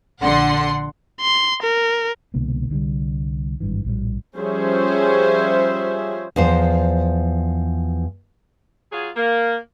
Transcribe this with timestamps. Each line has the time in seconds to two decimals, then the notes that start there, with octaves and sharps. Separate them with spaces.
0.19 A#1 D3 F#5 C6
1.21 C6
1.63 A#4
2.34 C2 B2 D3 A#3
2.70 C2 D3 D#3 G3
3.60 G#1 G2 E3
3.85 A#1 A2 G3
4.36 F3 G3 C#4 G#4 C5 E5
6.36 E2 F3 C5
8.92 F#3 F4 G#4
9.16 A#3